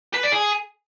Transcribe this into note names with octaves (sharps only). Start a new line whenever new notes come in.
B4
D5
G#4